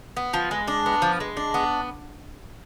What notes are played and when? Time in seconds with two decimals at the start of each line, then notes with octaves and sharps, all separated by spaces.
0.17 B3
0.34 F3
0.51 G#3
0.68 D4
0.86 B3
1.02 F3
1.20 G#3
1.37 D4
1.54 B3